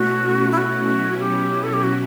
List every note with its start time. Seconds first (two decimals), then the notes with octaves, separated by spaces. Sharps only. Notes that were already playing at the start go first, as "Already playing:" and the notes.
Already playing: B2 A3 C#4 E4 F#4
0.52 E4
0.58 F#4
0.88 B2 F#3 C#4 E4
1.20 G4
1.63 A4
1.73 G4
1.84 F#4